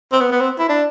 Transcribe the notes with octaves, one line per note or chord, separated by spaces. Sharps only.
C4
B3
B3
C4
E4
D4